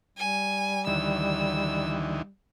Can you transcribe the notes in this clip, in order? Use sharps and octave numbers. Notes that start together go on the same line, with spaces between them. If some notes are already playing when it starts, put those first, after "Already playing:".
G3 G#5
D2 D#3 E3 E6